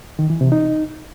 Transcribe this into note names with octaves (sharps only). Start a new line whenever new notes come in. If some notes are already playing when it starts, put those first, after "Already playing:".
D#3
E3
C3
D#4